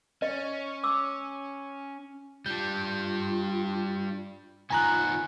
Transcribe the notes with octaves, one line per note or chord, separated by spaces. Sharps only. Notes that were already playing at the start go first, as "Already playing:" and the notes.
C#4 D#5
D6 E6
G3 D4 F4 G6
D#3 B3 F4 G#5 A#5 F#6